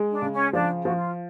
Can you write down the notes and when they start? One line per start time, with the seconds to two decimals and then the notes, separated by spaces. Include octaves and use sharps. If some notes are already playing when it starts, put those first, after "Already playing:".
Already playing: G#3
0.11 D4
0.22 C#3
0.33 C#4
0.53 F3 D4
0.84 F3 F#4
0.96 F4